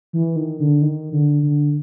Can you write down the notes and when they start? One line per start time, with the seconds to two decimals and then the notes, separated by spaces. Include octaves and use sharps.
0.13 E3
0.36 D#3
0.60 D3
0.82 D#3
1.12 D3
1.43 D3